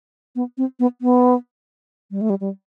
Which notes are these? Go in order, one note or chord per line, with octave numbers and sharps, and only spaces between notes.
B3
C4
B3
B3
G3
A3
G3
G3